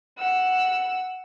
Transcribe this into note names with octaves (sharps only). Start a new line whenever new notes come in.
F#5 E6